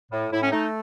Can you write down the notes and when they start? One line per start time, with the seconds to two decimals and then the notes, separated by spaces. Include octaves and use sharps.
0.11 A2
0.31 A2 E4
0.41 C#4
0.51 A3 D#4